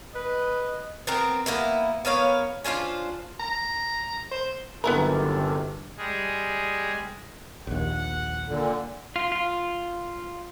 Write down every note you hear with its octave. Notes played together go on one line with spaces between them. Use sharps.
B4 D#5
B3 C4 A#4
A#3 B3 E4
B3 A#4 C#5 F5
C#4 D4 F4 C5
A#5
C5
G1 F#2 C3 D#3 B3 E4 A4 A#4
G3 G#3 G#4
A#1 D#2 F#5
A#2 D3
F4
F4